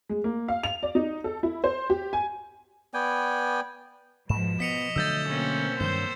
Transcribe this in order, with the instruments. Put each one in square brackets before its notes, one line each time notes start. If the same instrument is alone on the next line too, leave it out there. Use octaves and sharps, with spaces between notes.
[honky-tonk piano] G#3
A#3
F5
F7
D5
D#4
A4
E4
C5
G4
G#5
[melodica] B3 D5 G5 G#5
[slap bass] G#2 [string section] B2 F3 [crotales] E7
[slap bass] B3 [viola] D#5 [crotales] B6 C#7 F7
[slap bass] D3 F#3 A3 [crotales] E6 G6 A6
[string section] B2 A#3 C4 [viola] C#4
[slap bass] G2 D#3 F#3 [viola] C5 [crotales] G6